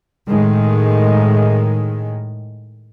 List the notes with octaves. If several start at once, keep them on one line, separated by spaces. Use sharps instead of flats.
A2 D#3 G#3